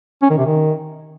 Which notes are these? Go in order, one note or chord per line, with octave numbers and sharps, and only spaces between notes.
C#4
D#3
C3
D#3